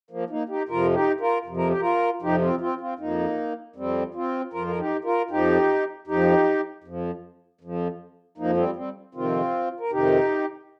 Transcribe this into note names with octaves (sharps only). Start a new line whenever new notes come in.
F3 A#3
A#3 D#4
D#4 G4
F2 C3 F3 F4 A#4
D#4 G4
F4 A#4
F2 C3 F3
A#4
G4
F4 A#4
F2 C3 F3 D#4 G4
C4 F4
C4 F4
C4 F4
F2 F3 A#3 D#4
F2 F3 G3 C4
C4 F4
F2 F3 F4 A#4
A#4
D#4 G4
F4 A#4
F2 F3 D#4 G4
F2 F3 D#4 G4
F2 F3
F2 F3
F2 F3 A#3 D#4
G3 C4
G3 C4
F2 C3 D#3 C4 F4
A#4
F2 C3 D#3 D#4 G4